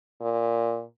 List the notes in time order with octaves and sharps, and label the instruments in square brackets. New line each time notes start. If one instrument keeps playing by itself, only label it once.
[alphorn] A#2